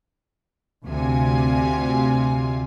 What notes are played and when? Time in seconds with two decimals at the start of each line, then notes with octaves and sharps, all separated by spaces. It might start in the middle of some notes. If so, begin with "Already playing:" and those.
0.86 D2 C3 F4 G#5